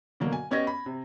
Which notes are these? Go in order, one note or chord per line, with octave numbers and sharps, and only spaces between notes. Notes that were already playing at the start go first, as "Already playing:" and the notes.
B2 D3 F#3 A#3
G#5
B3 C#4 G4 D#5 G#6 A#6
B5
C3